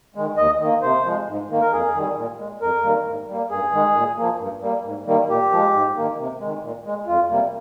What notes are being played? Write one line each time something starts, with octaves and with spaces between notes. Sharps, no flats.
D#3 G#3
D#2 D#5
D#3 A#3
C3 C5
F3 G#3
G#2
D#3 A#3
A#4
F2 G#4
D#3 G3
A#2
G#3
F2 A#4
D#3 G3 A#3
G#2
G3 A#3
G2 G#4
D#3 G#3
A#2
F3 A#3
G2
G3 A#3
G#2
D#3 G3 A#3
A#2 G4
F3 G#3
G#2
D#3 A#3
C3
D#3 G#3
A#2
G#3
F2 F4
C3 G3 A#3